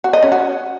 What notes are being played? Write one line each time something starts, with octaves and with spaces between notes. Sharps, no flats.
F#4
D#5
C#4
F#4